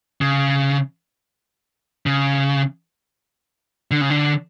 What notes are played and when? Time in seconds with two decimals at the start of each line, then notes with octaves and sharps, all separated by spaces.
0.21 C#3
2.06 C#3
3.91 D3
4.01 C#3
4.10 D3